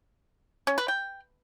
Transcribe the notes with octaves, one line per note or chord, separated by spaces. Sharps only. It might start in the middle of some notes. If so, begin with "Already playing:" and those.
C#4
B4
G5